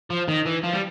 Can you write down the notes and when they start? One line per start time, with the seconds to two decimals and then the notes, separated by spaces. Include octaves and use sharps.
0.10 F3
0.28 D#3
0.46 E3
0.63 F3
0.73 G3